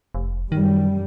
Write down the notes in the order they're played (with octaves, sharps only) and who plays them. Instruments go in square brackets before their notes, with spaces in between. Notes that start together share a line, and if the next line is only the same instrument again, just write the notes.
[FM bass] F1
[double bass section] F#2 G3 [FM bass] D#3